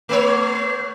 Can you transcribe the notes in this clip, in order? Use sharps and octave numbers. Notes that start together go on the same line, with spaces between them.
A3 B3 C#5